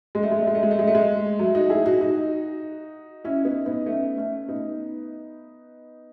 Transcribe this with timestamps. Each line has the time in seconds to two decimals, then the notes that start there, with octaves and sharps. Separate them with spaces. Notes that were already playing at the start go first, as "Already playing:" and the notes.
0.15 G#3
0.23 A3
0.32 G#3
0.39 A3
0.47 G#3
0.55 A3
0.63 G#3
0.71 A3
0.79 G#3
0.88 A3
0.95 G#3
1.39 F#3 A3
1.55 D#4 F#4
1.70 E4 G#4
1.85 D#4 F#4
2.01 D#4 F#4
3.24 C#4 E4
3.45 B3 D#4
3.66 B3 D#4
3.86 A3 C#4
4.18 A3 C#4
4.49 B3 D#4